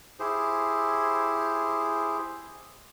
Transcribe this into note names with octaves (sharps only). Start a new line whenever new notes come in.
E4 G4 G#4 C5